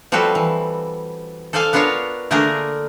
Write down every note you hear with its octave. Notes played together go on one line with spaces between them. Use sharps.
F3 G3 C4 F#4 A4 B4
E3
A4 C5 D5 F5 G#5 A5
B3 D4 F4 A#4 C#5 F5
D3 A3 A#3 D4 G#4 A#4